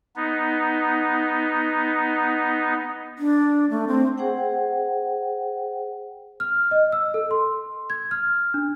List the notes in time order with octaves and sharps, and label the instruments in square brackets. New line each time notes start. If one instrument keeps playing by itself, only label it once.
[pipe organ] B3 D#4
[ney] D4
A3
C4
[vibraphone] G#4 C5 F#5 G5
[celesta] F6
D#5
E6
A4
C6
G#6
F6
D4